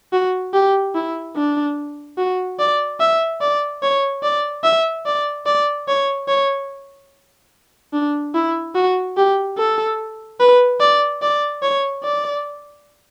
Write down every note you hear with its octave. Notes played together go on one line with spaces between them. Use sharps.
F#4
G4
E4
D4
F#4
D5
E5
D5
C#5
D5
E5
D5
D5
C#5
C#5
D4
E4
F#4
G4
A4
B4
D5
D5
C#5
D5